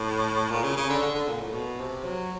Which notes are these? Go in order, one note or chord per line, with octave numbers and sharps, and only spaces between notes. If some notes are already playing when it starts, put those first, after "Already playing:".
Already playing: A2
A#2
C#3
C#3
D3
D3
D3
A#2
A2
B2
C3
F#3